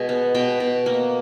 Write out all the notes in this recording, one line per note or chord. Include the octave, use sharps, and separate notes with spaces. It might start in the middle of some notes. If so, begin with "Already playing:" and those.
Already playing: B2 G#3 G#5
B3
B2 G5
B2
A#3